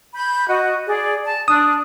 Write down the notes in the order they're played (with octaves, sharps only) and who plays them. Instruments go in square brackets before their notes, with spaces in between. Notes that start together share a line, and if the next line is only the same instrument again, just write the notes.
[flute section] B5 G6
F#4 D#5
G#4 D5
A5
[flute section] D4 [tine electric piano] D#6